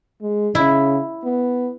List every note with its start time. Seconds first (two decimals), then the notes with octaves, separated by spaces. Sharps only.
0.22 G#3
0.55 C#3 E4
1.25 B3